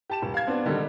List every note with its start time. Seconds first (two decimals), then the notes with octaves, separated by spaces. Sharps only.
0.10 G4 A5 E7
0.22 D#1
0.34 F5 G#6
0.47 B3 C4 D4
0.65 B2 D3 D#3 G3 D#4 A4